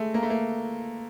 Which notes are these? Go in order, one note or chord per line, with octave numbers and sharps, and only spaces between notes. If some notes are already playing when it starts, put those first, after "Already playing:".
Already playing: G#3 A3
A#3
A3
A#3